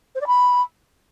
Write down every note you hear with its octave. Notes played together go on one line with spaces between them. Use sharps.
C5
D5
B5